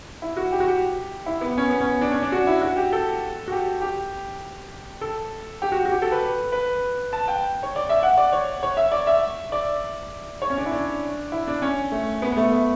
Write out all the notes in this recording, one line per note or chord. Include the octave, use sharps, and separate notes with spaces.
E4
F#4
G4
F#4
G4
E4
B3
C#4
B3
C#4
D4
C#4
D4
F#4
E4
F#4
G4
A4
F#4
G4
G4
A4
G4
F#4
F#4
G4
A4
B4
B4
A5
G5
C#5
D5
E5
F#5
D5
C#5
C#5
E5
D5
E5
D5
C#5
C#4
D4
E4
D4
E4
D4
C#4
A3
B3
B3
A3
A3